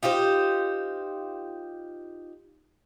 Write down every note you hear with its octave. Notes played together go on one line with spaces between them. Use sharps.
D#4 F4 G4 C5